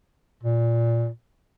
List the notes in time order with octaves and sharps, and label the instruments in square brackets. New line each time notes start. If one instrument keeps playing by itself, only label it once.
[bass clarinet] A#2